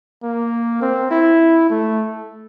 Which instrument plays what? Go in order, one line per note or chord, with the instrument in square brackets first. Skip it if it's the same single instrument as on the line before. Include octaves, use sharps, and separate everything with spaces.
[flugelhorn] A#3
C4
E4
A3